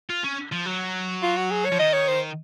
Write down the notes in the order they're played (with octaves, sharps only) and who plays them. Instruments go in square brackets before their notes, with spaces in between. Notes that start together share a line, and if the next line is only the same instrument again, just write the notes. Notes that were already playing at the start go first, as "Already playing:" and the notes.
[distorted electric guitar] F4
C#4
F3
F#3
[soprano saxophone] F4
F#4
G#4
C#5
[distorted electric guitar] F3
[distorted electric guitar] D#3 [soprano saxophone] D#5
[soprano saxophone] C#5
C5